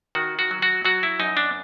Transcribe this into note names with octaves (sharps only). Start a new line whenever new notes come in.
D#3 F#4
F#4
F#3
F#4
F#3 F#4
E4
F#2 D#4
D4